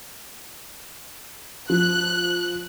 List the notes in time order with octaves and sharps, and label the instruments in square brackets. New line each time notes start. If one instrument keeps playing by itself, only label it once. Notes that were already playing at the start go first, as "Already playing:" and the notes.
[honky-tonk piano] F3 [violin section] F#6